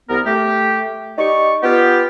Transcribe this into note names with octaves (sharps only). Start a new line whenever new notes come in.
C2 B3 A#4
A3 G4
D#4 G4 D5 C#6
B3 F4 G4